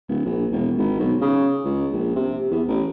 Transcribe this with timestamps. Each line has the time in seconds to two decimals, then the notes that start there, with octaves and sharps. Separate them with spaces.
0.09 D1
0.26 A#1
0.52 E1
0.78 G#1
0.99 B1
1.21 C#3
1.65 C#2
1.92 A#1
2.16 C3
2.51 E2
2.68 A1